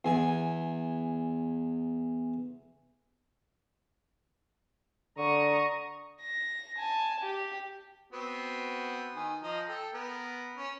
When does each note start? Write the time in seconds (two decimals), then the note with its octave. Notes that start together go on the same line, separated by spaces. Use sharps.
0.05 E2 G#5
5.18 D3 A#5 C#6 D#6
6.21 A#6
6.78 G#5 A5
7.21 G4
8.13 B3 C4 F#4
9.16 D#3 G#5
9.43 F3 D#5 A#5
9.68 A4 G5
9.94 B3 A#4
10.57 C#4